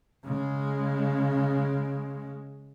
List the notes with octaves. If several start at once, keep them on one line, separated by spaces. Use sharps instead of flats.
C#3 G#3